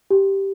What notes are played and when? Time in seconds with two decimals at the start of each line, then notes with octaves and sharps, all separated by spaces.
0.11 G4